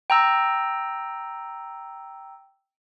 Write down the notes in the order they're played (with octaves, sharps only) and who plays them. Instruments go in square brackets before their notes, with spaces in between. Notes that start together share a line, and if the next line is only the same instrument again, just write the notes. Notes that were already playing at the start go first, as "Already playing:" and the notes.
[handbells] G5 A#5 E6